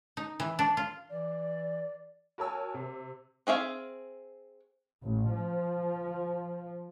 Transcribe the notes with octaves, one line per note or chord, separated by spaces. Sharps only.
D#4
E3
D4
F4
E3 D5
F#4 A#4 C#5 G#5 A5 E6
C3
C4 G#4 E5 F5
A1
F3